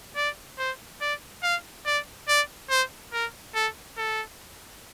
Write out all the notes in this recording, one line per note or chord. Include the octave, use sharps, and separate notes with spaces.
D5
C5
D5
F5
D5
D5
C5
A#4
A4
A4